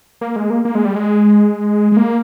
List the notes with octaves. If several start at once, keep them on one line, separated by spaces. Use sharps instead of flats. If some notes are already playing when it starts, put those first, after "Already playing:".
A#3
G#3
A#3
A#3
G#3
G3
G#3
G#3
A#3